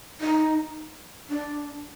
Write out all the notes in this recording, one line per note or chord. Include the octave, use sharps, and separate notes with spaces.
D#4
D4